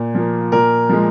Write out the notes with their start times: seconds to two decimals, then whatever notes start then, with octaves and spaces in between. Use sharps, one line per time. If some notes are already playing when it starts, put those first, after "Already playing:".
Already playing: A#2
0.14 F3 A#3
0.52 A#2 A#4
0.89 F3 G#3